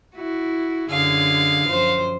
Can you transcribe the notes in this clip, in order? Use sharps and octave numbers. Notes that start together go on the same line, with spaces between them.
E4 F#4
F#2 D3 G#4 F5
F#2 F3 C5